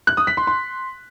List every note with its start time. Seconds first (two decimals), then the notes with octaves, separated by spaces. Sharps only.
0.07 F#6
0.17 D#6
0.27 B6
0.37 C6
0.47 C6